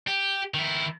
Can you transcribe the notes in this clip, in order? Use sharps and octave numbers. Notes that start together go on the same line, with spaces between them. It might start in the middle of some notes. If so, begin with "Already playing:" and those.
G4
D#3 E4